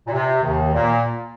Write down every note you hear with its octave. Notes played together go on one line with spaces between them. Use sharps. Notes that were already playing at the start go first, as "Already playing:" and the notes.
A#2
C3
D#2 D#3
A#2 A#3